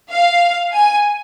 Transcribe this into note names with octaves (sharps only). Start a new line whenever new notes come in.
F5
G#5